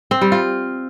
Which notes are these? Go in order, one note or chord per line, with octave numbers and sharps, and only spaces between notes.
C4
G3
F4